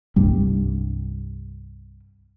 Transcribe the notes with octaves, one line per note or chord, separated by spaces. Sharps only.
C2 G2 G3